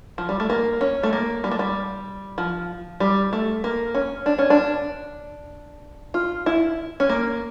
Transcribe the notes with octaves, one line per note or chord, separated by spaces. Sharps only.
F3
G3
A3
A#3
C#4
A3
A#3
G3
A3
G3
F3
G3
A3
A#3
C#4
D4
C#4
D4
F4
E4
C#4
A#3